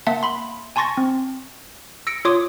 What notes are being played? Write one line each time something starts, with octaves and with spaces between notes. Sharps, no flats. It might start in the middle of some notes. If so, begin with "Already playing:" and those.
A#3 E5 F#5 A5
B5 C6
G#5 A5 C6 C#6 A6 A#6
C4
E6 A#6 C#7 D7
F4 C#5 C6 D6 D#6